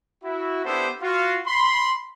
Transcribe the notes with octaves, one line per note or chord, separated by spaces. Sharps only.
E4 F#4
B3 D4 E4 G4 A4 C5
F4 F#4
B5 C6